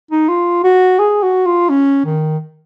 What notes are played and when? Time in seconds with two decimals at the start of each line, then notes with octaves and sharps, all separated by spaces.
0.11 D#4
0.29 F4
0.64 F#4
0.99 G#4
1.22 F#4
1.46 F4
1.69 C#4
2.05 D#3